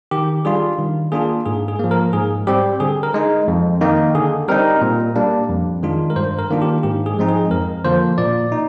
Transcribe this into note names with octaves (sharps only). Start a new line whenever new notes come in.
D#3 G4
G3 D4 F4 G#4
D#3
A#3 D4 F4 G#4
G#2 G#4
G#4
F3 A#3
A#4
G#2 G#4
G3 C4 G4
D3 G#4
A#4
G#3 D#4
F2
D#3 A#3 D#4
D3 G#4
G3 C4 D#4 A#4
A#2
G3 A#3 D4
F2
D#3 G#3 D4 F4
A#4
G2 C5
A#4
D#3 A#3 D4 F4
G4
G#2 G4
G#4
F3 G#3 C4 D#4
G#4
F2 A#4
D3 F3 A#3 C5
A#2 D5
D#4